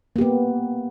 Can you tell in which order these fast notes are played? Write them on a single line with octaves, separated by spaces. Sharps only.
A#3 G4 B3